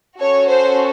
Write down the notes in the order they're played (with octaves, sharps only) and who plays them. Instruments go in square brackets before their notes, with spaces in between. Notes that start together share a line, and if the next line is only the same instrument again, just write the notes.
[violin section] C#4 F#4 A4 C#5
C5